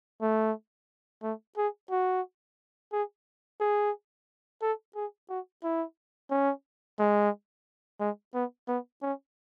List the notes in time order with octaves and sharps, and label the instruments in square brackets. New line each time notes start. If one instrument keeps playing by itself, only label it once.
[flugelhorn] A3
A3
G#4
F#4
G#4
G#4
A4
G#4
F#4
E4
C#4
G#3
G#3
B3
B3
C#4